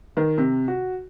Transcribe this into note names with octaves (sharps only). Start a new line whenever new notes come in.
D#3
C3
F#4